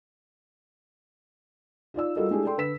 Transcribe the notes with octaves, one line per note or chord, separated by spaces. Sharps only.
D#4 F4 D5 E6
G3 F4 F#4 A4 A#4 D#5
G#3 A3 D4 E4 G4 G#4
A4 D5 G5 C6
D3 B4 E6 B6 E7